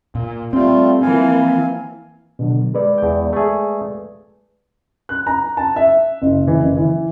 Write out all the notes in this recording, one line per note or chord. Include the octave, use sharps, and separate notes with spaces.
A#2
G3 A3 C4 F4
E3 F3 A#3 F5 G#5
B2 D3 F#3
G#3 B4 D5
E2 G5
A3 G#4
F#6
A#5
A5
E5
F#1
E3
F#1
E3